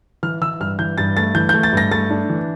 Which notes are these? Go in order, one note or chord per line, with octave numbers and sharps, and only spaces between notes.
E3 F6
E3 E6
G2 F6
E3 G6
G2 A6
A3 A6
E3 G6
G6
A3
A6
G2 A#6
A3 A6
D4
E3